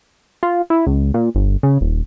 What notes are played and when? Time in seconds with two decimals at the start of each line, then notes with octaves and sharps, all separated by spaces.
0.43 F4
0.70 E4
0.87 C#2
1.14 A#2
1.35 G1
1.63 C#3
1.81 D#1